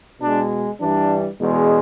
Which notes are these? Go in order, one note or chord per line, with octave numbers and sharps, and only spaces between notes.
B2 G#3 D4
G2 E3 G3 D4
E2 B2 G#3